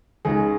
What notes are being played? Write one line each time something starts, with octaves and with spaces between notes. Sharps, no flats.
C#2 C#3 G#3 D#4 G#4